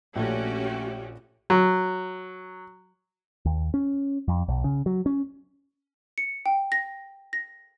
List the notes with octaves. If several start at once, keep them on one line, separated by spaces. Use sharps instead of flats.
A#1 A3 C#4 F#4 G4 A4 D5
F#3
D#2
C#4
F2
B1
C#3
F#3
C#4
C#7
G5
A#6
A#6